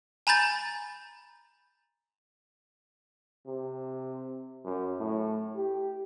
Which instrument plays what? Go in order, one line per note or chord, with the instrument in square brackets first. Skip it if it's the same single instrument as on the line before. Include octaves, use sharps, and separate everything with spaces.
[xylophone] G#5 A#5 B5 G6 A6
[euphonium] C3
F#2
A2
G4